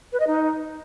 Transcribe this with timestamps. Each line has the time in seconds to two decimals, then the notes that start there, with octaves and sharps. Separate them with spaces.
0.12 B4
0.19 D#5
0.27 D#4